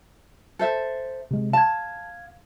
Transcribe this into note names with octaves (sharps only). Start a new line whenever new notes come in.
A4 C5 E5
C3 G#3
F5 A5 G#6